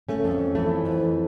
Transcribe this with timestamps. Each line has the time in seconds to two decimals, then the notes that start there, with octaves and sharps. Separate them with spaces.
0.09 A3 C#4
0.24 F2
0.55 E3 A3
0.85 F2